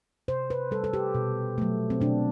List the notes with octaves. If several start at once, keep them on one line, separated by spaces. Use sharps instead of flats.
C3 C5
B4
G3 A4
A4
G4
B2
F#3 A3
C4
B2 D4